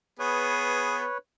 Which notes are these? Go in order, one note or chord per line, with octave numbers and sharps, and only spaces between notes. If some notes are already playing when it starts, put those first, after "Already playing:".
B3 G#4 B4 C#5